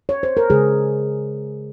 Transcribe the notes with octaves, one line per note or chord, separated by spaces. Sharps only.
C#5
C5
A#4
C#3 G#3 G#4